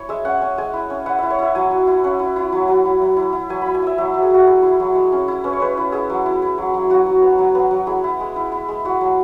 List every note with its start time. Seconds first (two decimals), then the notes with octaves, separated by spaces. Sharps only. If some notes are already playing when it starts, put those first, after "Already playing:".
Already playing: E4 C#5 G#5
0.09 G#3 E5
0.25 C#4 F#5
0.41 C#4 G#5
0.58 G#3 G#5
0.73 E4
0.90 C#4
1.06 E4 F#5
1.18 E4 E5
1.30 C#5
1.39 E4 E5
1.55 F#3 G#5
1.71 F#3
1.87 E4
2.04 C#4 F#5
2.19 E4
2.36 E4
2.52 F#3
2.68 F#3
2.85 E4
3.01 F#3
3.17 E4
3.33 E4
3.50 F#3 G#5
3.62 E4 B5
3.75 G#5
3.82 E4 E5
3.98 F#3 E5
4.14 F#3
4.22 G#4
4.30 F#3 F#4
4.47 E4 G#4
4.63 E4
4.80 F#3
4.95 G#3
5.12 C#4
5.28 E4
5.44 C#4 B4
5.53 C#5
5.60 G#3 B4
5.77 E4
5.92 E4 G#4
6.10 F#3
6.26 E4
6.42 E4
6.58 F#3
6.74 F#3
6.90 F#3 F#4
7.06 F#3
7.22 B3
7.38 F#3
7.55 B3
7.71 F#3
7.87 E4 G#4
8.04 E4
8.20 G#3
8.36 E4
8.52 E4
8.68 G#3
8.85 E4 F#4
9.01 F#3